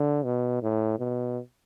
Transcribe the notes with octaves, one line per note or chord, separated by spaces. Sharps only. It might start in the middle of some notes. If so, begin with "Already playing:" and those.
Already playing: D3
B2
A2
B2